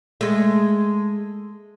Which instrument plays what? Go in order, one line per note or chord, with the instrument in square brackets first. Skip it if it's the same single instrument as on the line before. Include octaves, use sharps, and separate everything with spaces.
[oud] G#3 A3